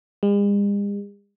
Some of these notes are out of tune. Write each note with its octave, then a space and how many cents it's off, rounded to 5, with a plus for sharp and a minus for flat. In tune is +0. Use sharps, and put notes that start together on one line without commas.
G#3 -45